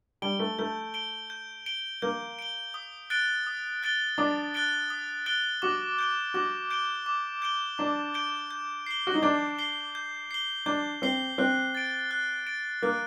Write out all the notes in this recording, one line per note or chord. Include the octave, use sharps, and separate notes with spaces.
G3 D7 G7
A3
A3 G6
D7 G7
G6
D7 G7
A#3 G6
D7 G7
D#6
F#6 A6 D7 G7
D#6
F#6 A6 D7 G7
D4 D#6
F#6 A6 D7 G7
D#6
F#6 A6 D7 G7
F#4 D6
G6 D7 G7
F#4 D6
G6 D7 G7
D6
G6 D7 G7
D4 D6
G6 D7 G7
G6
C7 G7
F#4
D#4
D4 G6
C7 G7
G6
C7 G7
D4 G6
C4 C7 G7
C4 F#6
A6 D7
F#6
A6 D7
A#3 F#6